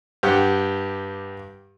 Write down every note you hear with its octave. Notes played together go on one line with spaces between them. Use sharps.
G2 G4 F#5 G5